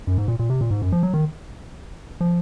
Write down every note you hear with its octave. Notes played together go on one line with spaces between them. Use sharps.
F#2
G#2
A#2
A#2
C3
A#2
G#2
F#2
F3
F#3
D#3
F3